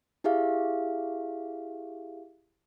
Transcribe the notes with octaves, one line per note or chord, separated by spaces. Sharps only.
E4 G4 G#4 E5 F5